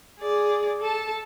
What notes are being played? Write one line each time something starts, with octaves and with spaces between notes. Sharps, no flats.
G#4 D5
A4 A5